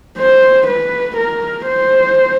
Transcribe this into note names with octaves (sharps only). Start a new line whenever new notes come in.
C5
B4
A#4
C5